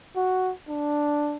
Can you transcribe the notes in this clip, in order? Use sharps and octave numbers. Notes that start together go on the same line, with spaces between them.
F#4
D4